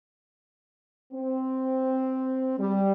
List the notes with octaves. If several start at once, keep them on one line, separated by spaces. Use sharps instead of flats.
C4
G3